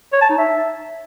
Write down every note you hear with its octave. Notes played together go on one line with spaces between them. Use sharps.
C#5
A5
D#4
E5